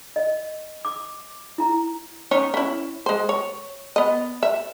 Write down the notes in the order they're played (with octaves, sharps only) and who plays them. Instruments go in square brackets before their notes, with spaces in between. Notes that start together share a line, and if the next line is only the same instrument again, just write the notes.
[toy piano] D#5
D6
E4 A#5
[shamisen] C#4 D#4 C#5
C#4 E4
G#3 C5
C#5
B3 D#5
E5